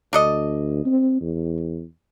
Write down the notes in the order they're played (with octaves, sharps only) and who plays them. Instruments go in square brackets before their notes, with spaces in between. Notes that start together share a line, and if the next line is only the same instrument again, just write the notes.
[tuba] D2 [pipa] D4 A4 D#5
[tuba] C4
E2